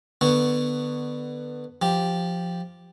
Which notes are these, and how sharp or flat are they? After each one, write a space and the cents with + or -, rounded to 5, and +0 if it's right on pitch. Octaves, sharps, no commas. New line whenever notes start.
D3 +25 B3 +0 C#6 +0
F3 +0 G4 +0